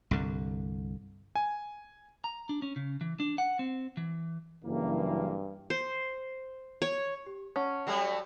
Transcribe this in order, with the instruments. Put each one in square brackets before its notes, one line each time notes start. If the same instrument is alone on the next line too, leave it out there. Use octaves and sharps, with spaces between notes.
[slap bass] C2 G2 D3
[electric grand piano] G#5
[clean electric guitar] A#5
D4
C#4
C#3
E3
D4
F#5
C4
E3
[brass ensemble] F#1 E3 A#3 [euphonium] G2
[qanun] C5
C#5
[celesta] G4
[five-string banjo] C#4 [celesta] F#5 A5 C#6
[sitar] F#3 G3 A3